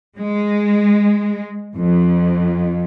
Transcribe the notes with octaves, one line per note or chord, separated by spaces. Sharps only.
G#3
F2